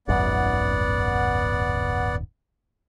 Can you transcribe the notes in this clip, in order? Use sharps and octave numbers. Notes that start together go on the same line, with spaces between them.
D#1 G#1 F#2 B3 D5 F#5